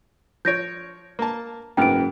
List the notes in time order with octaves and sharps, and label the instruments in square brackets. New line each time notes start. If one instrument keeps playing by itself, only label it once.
[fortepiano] F3 C#5 [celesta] G6 A#6 D7
[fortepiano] A#3 A5
[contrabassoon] F#1 [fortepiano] G#2 B3 F6 [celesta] G5 D7